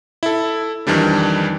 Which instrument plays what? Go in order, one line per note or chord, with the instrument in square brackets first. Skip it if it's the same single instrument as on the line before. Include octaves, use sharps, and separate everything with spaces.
[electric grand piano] E4 A4
F2 D#3 E3 G3 D4